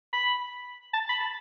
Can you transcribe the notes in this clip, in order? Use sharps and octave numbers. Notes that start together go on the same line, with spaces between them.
B5
A5
B5
A5